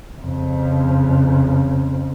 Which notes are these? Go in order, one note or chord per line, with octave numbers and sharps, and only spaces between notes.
F2 C#3